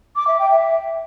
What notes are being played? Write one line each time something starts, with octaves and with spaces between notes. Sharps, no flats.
D6
E5
G5
E5